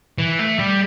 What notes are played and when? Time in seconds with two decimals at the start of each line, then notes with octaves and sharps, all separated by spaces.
0.18 E3
0.39 A3
0.59 G3